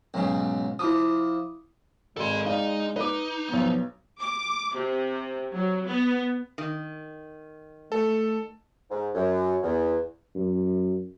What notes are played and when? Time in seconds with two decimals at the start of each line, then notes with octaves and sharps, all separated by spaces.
0.14 B1 G#2 C#3
0.79 F3 E4 D6 D#6
2.17 G#1 G#3 A4 C6
2.46 D#4 D5 F5
2.96 D#4 B4 D6
3.49 B1 F3 B3
4.19 D6
4.75 C3
5.52 F#3
5.86 B3
6.58 D#3
7.92 A3 A4
8.91 G#2
9.15 F#2
9.63 E2
10.35 F#2